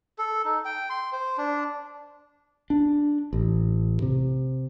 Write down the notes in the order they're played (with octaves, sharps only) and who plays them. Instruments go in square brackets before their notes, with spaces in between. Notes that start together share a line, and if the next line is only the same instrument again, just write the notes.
[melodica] A4
D#4
G5
C6
C5
D4
[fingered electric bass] D4
A1
C3